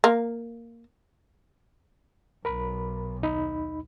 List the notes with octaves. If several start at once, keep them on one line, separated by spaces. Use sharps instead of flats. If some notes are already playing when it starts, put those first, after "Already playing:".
A#3
B1 A#4 B5
D#2 D#4 B5